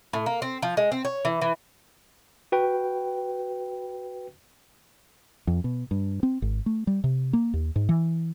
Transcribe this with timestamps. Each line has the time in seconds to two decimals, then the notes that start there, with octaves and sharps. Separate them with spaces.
0.13 A2
0.26 A#3
0.42 C4
0.62 F3
0.77 G#3
0.92 C4
1.05 C#5
1.25 E3
1.42 E3
2.52 F#4 B4 G5
5.47 F2
5.64 B2
5.91 G2
6.23 C4
6.42 G#1
6.66 A3
6.87 G3
7.04 C3
7.33 A#3
7.54 D#2
7.76 G#2
7.89 E3